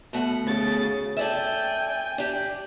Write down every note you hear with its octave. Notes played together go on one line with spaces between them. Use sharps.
B2 A3 F#5
D2 C#3 A6
A4 D5 E5 G5 G#5
D4 G4